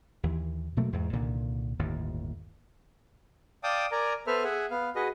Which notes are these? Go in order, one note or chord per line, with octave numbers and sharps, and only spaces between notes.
D#2 E3
B2 F#3 A3 A#3
E2 G#2
C2 A#2 D3 D#3
G1 D#2 A2
D5 F5 G5 A5 D6 D#6
A#4 D5 G#5 A#5
B3 A4 B4 C5 E5 F6
G#4 E5 F#5 G#5
B3 F5
F#4 G#4 B4 D#5